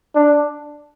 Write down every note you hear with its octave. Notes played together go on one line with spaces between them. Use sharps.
D4